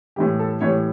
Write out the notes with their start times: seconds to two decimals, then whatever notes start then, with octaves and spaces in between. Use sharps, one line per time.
0.16 A2 E3 G3 G4
0.39 A4
0.61 A2 E3 G3 C#5